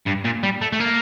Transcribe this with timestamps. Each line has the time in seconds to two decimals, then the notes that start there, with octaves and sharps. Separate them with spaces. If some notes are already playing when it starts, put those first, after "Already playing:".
0.06 G2
0.24 A#2
0.43 G3
0.62 A3
0.73 A3
0.80 A#3